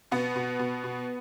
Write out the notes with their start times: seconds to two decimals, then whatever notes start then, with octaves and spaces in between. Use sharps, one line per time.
0.11 B2 B3
0.36 B2
0.59 B2
0.84 B2